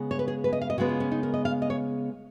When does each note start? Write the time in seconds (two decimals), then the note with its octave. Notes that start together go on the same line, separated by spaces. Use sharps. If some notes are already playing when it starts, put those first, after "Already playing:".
Already playing: C#3 G#3 B3
0.11 C#5
0.19 B4
0.28 G#4
0.44 B4
0.53 D#5
0.61 F5
0.70 D#5
0.78 C#3 G#3 B3 F#4
0.89 F4
1.00 C#4
1.12 D#4
1.23 A#4
1.34 D#5
1.45 F5
1.62 D#5
1.70 C#5